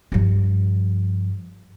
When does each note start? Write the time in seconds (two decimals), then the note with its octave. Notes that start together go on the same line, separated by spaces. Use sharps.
0.12 G2 F3